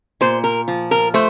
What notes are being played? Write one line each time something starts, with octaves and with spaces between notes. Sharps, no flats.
A#2 C5
A#4
F3
A#4
A3 C5